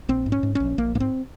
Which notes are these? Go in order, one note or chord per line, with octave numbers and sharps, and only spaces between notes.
A#1 C4
G#2
C#4
G#2
A#1 C#4
A#1 A#3
G#2 A#3
C4